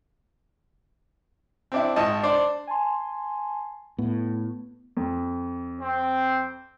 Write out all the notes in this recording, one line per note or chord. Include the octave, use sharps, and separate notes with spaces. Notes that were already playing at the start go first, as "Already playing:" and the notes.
C4 D4 E4
G#1 D#5 A5
D4 C5 D5
G#5 A5 C6
A2 B3
F2
C4